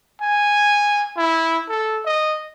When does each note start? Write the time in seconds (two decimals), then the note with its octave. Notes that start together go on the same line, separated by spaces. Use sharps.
0.21 G#5
1.17 E4
1.68 A4
2.05 D#5